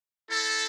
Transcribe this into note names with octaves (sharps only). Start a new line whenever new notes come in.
C4 E4 A4